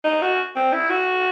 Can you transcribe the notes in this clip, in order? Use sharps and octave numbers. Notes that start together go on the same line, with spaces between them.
D#4
F#4
C4
E4
F#4